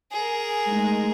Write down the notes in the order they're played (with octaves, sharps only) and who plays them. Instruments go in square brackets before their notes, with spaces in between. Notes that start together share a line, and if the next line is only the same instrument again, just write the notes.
[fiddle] G#4 A#4
[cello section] G#3 A3 D#4